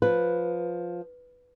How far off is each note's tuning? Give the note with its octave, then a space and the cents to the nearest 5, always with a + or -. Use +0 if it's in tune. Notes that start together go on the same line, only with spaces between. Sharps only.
F3 +10 B4 +0